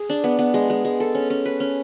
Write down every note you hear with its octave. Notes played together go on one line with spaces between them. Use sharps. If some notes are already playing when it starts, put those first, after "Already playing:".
Already playing: G#4
D4
B3
B3
G#3
G#3
G#3
A4
C#4
C#4
B4
C#4